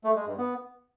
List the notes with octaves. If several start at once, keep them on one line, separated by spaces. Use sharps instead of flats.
A3
G#3
G2
B3